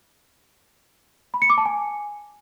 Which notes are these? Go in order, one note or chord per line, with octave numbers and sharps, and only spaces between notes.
B5
C#7
D6
A5
G#5